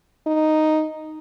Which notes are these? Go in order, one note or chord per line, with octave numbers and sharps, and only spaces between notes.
D#4